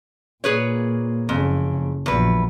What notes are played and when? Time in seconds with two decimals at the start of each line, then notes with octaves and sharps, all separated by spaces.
0.44 A#2 A#3 G#4 B4 C#5
1.29 F#1 F2 C#3
2.06 A#1 E2 F#3 B4